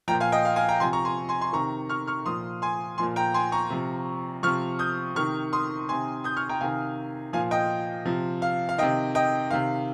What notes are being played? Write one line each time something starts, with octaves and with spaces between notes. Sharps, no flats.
A#2 F3 G5 A#5
F5 G#5
D#5 G5
F5
F5 G#5
G5 A#5
C3 F3 G#5 C6
A#5 C#6
G#5 C6
G#5 C6
G#5 C6
C3 D#3 A#5 C#6
C#6 F6
C#6 F6
A#2 F3 C6 D#6
G#5 C6
A#2 F3 G#5 C6
G5 A#5
G#5 C6
A#5 C#6
C3 F3
C3 F3 C#6 F6
D#6 G6
C3 D#3 C#6 F6
C6 D#6
C3 D#3 G#5 C6
D#6 G6
C#6 F6
G5 A#5
C3 D#3 F5 G#5
A#2 F3 F5 G#5
D#5 G5
C3 F3
F5
F5
C3 D#3 D#5 G5
D#5 G5
C3 D#3 F5